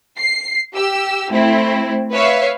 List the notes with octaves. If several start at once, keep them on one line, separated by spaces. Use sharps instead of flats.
C7
G4 E6
A3 C4 E4
B4 C#5 E5 F5